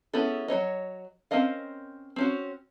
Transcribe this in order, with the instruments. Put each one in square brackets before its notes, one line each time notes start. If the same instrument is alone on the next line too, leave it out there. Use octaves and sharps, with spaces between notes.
[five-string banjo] B3 C#4 E4 G#4 A4
F#3 D#4 C#5 D#5
C4 C#4 A#4 D#5 F5
C4 C#4 F#4